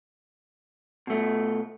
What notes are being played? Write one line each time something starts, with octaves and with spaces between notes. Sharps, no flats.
B2 A3